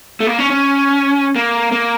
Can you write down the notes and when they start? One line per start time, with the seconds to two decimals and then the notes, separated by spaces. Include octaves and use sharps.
0.20 A3
0.27 A#3
0.39 C#4
0.50 C#4
1.36 A#3
1.72 A#3